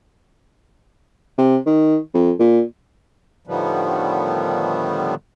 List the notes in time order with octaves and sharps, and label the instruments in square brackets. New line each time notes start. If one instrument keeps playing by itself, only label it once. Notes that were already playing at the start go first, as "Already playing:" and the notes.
[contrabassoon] C3
D#3
F2
A#2
[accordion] A2 D3 D#3 F3 G3 B3